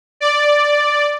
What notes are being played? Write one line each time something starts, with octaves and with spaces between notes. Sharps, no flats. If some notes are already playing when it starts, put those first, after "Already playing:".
D5